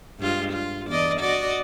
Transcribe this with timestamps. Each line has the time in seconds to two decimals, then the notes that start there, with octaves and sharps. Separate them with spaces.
0.19 G2 G#3 F4
0.52 F4
0.88 E2 D5 D#5
1.20 F#4 D5 D#5